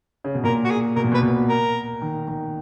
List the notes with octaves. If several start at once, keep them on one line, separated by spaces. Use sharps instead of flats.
C#3
B2
A#2 A#4
F#4
G#4
B2 A#4
A#2
B2
B4
B2
A#4
D#3
D#3